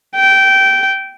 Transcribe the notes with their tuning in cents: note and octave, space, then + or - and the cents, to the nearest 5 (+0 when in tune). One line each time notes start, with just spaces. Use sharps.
G5 -15